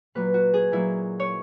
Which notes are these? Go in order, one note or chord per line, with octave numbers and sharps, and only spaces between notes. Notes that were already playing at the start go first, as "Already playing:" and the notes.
A#2 F#3 A#3 B4
F#4
G#4
A#2 F#3 A#3 E4
C#5